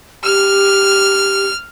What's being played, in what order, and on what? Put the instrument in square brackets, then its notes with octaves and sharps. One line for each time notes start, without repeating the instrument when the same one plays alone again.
[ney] G4 [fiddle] F6